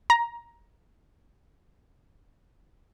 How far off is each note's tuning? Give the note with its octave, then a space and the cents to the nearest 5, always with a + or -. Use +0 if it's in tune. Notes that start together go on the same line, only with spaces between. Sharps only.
A#5 +15